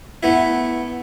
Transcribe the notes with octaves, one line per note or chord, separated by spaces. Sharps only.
A3 B3 E4